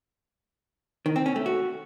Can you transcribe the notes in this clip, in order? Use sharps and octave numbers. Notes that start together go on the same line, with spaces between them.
D#3
C4
C#4
A3
F#4